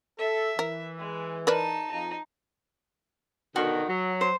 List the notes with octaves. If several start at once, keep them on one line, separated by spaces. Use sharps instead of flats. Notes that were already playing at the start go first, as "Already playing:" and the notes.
A4 E5
E3 A#4
G#3
D#4 A#4 B4 D5 A5
F2 F3 D#4 F4
B2 D3 D#3 F#4
F#3
C5